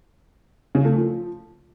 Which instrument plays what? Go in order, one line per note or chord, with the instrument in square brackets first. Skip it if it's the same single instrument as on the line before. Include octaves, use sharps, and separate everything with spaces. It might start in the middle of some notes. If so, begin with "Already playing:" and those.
[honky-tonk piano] C#3
A3
F3